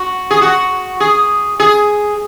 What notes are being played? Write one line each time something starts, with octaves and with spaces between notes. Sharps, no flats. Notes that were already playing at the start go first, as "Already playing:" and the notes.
Already playing: F#4
G#4
F#4
G#4
G#4